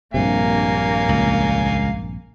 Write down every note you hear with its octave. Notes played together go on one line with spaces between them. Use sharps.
A#1 G2 C3 A#3 F5 G#5
C#2